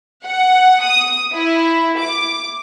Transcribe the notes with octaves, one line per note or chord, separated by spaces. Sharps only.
F#5
D#6
E4
D6